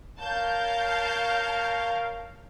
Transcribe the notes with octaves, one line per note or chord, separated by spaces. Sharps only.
A#4 C#5 F5 A5 G6